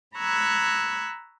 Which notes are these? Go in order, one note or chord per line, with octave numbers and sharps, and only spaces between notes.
A#5 B5 C#6 E6 F#6 G#6